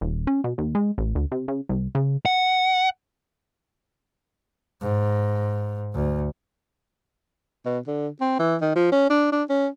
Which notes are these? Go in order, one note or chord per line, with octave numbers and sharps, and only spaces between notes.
D#1
C#4
B2
D#2
G#3
A1
D2
C3
C#3
C2
C#3
F#5
G#2
D2
B2
D3
C4
E3
D#3
F3
C#4
D4
D4
C#4